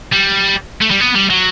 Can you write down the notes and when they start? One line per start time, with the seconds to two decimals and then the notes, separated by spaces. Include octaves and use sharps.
0.13 G3
0.82 A3
0.91 G3
1.01 B3
1.16 G3
1.30 F#3